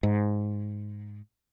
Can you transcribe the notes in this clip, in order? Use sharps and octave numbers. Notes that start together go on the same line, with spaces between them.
G#2